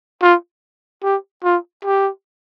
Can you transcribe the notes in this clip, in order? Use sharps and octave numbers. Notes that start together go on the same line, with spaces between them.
F4
G4
F4
G4